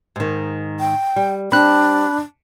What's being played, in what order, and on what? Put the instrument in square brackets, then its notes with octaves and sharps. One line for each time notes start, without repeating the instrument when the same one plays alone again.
[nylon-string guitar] G#2 D#3
[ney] G5
[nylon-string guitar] G3
[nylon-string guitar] G3 C4 [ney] D4 [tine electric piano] B5 F#6